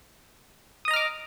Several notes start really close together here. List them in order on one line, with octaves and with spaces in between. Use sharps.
D#6 D#5 A#5 F6 D6